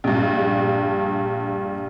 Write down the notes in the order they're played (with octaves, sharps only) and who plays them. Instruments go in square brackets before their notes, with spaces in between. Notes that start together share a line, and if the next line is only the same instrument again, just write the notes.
[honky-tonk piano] A#1 G2